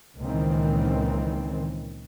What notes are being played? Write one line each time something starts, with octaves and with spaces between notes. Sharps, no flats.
C#2 A#2 D#3 E3 C4